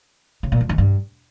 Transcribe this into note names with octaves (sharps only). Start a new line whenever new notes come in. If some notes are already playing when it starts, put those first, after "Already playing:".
C#3
A#2
F2
D#3
G2